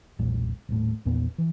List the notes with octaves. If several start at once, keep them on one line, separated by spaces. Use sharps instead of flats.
E1 B1 A#2 G#3
D#1 A2
A#1 E2 A#2 B3
E3